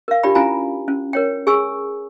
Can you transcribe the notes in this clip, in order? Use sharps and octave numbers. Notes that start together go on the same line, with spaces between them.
A#4 F5
D4 F4 G4 D5 G5 B5
C#4 E4 F4 F5 G#5 A#5
C#4
A#4 C#5 G5
G#4 G#5 C#6 E6